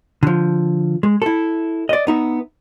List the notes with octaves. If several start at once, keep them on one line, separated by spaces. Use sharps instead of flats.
D3 F3
G#3
E4 A4
D5 D#5
B3 D#4 E5